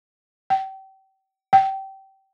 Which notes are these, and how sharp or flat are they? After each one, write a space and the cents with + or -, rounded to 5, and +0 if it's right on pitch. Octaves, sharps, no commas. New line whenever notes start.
G5 -35
G5 -25